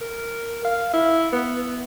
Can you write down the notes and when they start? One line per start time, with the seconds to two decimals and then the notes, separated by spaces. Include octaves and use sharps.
0.01 A#4
0.65 F5
0.93 E4
1.33 B3